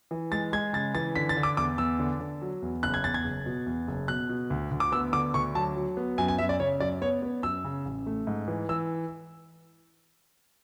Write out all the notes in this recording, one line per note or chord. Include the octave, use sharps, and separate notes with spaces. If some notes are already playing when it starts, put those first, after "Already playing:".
E3
G#3 A6
G#3 G#6
C#3 A6
E3 A6
D3 B6
A6
D3
D6
E2 D6
E2 E6
D3
D3
F#3
E2
F#1 F#6
G#6
E2 A6
G#6
F#1
B2
E2
F#1
B2 F#6
B2
D2
D2
D6
B3 E6
D3 D6
D2 C#6
F#3 A5
F#3
B3
F#2 G#5
G#5
F#2 E5
D5
C#3 C#5
F#2 D5
B3 C#5
B3
F#2 E6
C#3
A1
A3
G#2
E3
E3 E6